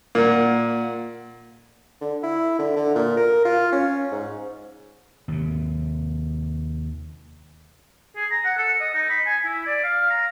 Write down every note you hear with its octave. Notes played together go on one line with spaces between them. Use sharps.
A#2 A#3 F#5
D3
E4
D3
D3
A#2
A#4
F4
C#4
G#2
D#2 C3
G#4
A#5
F#5
A4
D#5
D#4
B5
G#5
E4
D5
F5
A#5